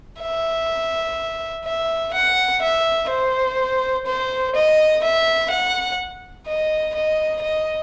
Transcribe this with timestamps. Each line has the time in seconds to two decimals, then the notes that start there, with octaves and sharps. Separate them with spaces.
0.21 E5
1.65 E5
2.14 F#5
2.62 E5
3.10 C5
4.06 C5
4.55 D#5
5.03 E5
5.51 F#5
6.47 D#5
6.95 D#5
7.43 D#5